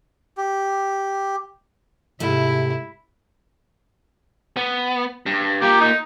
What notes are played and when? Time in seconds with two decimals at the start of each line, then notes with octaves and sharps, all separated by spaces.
0.37 G4
2.20 G#2 C3 A3 E4
4.57 B3
5.26 G2
5.62 A#3 F4 G4
5.81 D#4